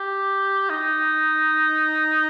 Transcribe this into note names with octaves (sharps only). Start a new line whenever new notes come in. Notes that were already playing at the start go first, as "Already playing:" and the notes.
Already playing: G4
D#4